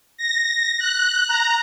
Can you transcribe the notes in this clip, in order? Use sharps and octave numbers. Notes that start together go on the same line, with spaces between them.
A#6
F#6
A#5